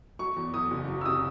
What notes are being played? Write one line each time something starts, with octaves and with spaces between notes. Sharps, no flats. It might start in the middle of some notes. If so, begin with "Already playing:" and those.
F#3 C#6
E2
E2 D#6
F#1
F#3
E6
C3 D#6